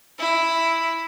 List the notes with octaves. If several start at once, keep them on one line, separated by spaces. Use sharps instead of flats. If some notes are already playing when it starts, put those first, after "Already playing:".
E4